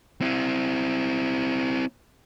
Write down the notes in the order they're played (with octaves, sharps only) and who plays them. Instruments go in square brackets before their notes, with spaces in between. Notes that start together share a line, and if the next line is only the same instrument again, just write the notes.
[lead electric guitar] C4 E4